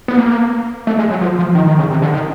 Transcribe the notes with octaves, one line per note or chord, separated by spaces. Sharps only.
B3
A#3
A3
G#3
F#3
F3
F3
D#3
D#3
C#3
C3
D3
D#3